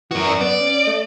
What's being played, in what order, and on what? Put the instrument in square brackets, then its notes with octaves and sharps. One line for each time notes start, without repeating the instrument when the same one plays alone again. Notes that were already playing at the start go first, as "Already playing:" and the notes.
[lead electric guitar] F#2 F#4 [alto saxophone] E3
[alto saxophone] D5
[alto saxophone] B3 [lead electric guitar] D5
[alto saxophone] C#4
A3